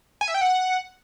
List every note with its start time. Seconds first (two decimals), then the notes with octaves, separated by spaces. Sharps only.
0.21 G#5
0.28 E5
0.34 G5
0.41 F#5